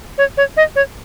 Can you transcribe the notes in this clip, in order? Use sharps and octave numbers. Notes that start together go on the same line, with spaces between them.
C#5
C#5
D#5
C#5